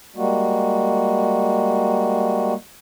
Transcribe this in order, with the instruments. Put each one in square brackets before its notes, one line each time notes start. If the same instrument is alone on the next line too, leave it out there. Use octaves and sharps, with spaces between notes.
[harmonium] G3 G#3 A#3 F#4